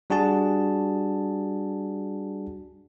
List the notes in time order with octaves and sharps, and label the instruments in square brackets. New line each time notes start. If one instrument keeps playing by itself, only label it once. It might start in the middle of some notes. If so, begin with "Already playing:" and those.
[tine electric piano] G3 D4 F#4 G#4 A5